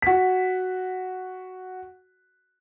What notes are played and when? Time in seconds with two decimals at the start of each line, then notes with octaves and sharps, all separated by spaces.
0.02 F#4 B6